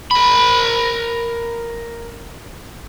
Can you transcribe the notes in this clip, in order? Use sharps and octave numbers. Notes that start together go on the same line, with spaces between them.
A#4 B5